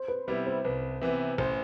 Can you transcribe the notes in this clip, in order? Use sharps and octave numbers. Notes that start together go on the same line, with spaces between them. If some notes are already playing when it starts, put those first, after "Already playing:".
Already playing: C5
B4
C3 G3 B3 E4
C5
C2 B4
C3 E3 B3 B4
A1 C5